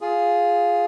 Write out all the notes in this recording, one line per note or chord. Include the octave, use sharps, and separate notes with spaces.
F4 G#4